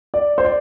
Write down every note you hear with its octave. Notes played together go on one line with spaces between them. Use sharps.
D5
C5
D5